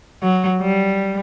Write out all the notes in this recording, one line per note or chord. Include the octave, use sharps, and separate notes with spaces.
F#3
G3